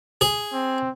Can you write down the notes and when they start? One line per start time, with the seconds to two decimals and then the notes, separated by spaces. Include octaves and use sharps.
0.21 G#4
0.53 C4